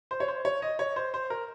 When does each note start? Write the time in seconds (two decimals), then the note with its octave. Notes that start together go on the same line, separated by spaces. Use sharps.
0.11 C5
0.20 C#5
0.28 C5
0.45 C#5
0.62 D#5
0.79 C#5
0.96 C5
1.14 C5
1.30 A#4